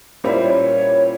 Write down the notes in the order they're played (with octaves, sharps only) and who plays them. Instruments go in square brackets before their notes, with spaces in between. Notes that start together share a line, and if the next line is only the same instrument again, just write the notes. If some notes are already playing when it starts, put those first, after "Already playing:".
[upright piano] A#2 G3 A#3 C#4 E4 [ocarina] C5
[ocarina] C#5